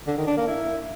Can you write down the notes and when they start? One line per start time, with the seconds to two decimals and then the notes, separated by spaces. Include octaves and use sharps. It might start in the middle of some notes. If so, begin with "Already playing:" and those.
0.07 D3
0.17 D#3
0.27 D4
0.37 A#3
0.47 E4